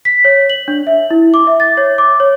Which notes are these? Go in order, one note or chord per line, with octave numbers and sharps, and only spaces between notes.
B6
C#5
F#7
D4
E5
E4
D6
E5
A6
C#5
D6
C#5